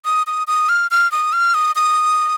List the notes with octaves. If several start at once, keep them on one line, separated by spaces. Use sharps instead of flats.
D#6
D#6
D#6
F6
F6
D#6
F6
D#6
D#6